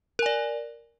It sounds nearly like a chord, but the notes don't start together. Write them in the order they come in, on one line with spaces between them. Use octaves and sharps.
A#4 G#5 D5